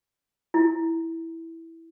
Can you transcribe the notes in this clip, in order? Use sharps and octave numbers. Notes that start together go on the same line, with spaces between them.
E4